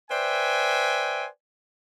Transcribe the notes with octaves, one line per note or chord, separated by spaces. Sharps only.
B4 C5 D5 E5 G5 G#5